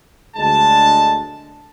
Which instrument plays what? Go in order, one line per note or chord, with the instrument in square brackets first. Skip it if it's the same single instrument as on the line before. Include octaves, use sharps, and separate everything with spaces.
[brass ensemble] D2 D3 G#3 A5